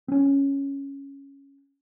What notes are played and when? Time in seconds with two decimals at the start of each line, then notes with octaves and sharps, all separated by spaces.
0.08 C4 C#4